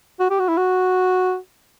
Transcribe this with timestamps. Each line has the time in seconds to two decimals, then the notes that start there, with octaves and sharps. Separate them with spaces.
0.20 F#4
0.30 G4
0.39 F#4
0.48 E4
0.57 F#4